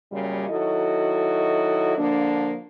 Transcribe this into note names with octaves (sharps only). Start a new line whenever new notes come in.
F#2 A#2 C#3 G3
D#3 F#3 E4 F#4 A4 D#5
D3 F3 A#3 D4